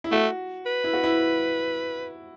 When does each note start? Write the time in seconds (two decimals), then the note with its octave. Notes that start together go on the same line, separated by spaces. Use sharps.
0.04 E4
0.11 A3 F#4
0.66 B4
0.84 E4
0.93 F#4
1.04 E4